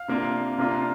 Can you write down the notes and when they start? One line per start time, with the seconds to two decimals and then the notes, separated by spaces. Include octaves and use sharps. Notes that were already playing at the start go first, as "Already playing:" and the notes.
Already playing: F5
0.08 C3 A#3 D4 F4
0.58 C3 A#3 D4 F4